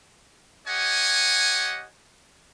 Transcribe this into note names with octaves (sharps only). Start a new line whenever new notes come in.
G4 C#5 D#5 F#5 G#5